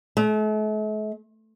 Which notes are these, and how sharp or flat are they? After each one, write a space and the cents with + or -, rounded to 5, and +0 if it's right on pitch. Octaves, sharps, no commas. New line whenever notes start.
A3 -45